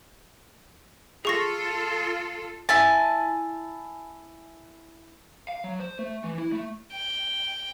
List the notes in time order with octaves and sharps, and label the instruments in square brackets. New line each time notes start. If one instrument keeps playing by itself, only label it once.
[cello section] F4 A4 [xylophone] G#4 C#6 A#6
[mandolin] E4 G#5 A5
[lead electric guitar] F5
F#3
C5
A3
E3
E4
A3
[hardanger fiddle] G5